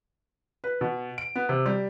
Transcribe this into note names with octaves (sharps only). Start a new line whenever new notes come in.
B4
B2
D7
B3
C3
G3